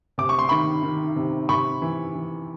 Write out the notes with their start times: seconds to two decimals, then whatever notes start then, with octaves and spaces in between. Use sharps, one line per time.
0.18 C3 D6
0.29 C#6
0.39 C6
0.49 D#3 B5 C#6
0.83 D#3
1.16 C3
1.49 C3 B5 C#6
1.82 E3
2.15 E3